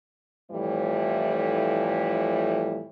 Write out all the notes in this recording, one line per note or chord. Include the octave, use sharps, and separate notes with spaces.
F2 A2 E3 F3 G3